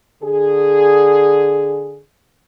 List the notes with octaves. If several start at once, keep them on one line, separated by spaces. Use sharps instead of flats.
D3 G#4